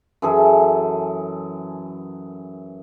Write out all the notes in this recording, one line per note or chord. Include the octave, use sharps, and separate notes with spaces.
F#2 E3 G#4 A4